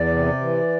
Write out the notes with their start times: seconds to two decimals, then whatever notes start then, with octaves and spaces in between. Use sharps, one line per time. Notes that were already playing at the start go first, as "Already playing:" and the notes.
Already playing: E2 D5
0.12 C3
0.41 E3